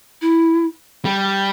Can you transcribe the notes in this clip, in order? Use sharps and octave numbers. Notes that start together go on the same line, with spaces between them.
E4
G3